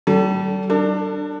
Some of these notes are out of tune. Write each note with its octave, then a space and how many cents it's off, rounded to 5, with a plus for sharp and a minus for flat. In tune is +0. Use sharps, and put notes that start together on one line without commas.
G3 -40 A4 +0
D4 +15 A4 +45 A5 +35